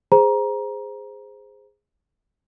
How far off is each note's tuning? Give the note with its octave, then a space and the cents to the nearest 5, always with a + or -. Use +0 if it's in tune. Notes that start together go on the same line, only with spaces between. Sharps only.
G#4 -10 C5 -10 A#5 +20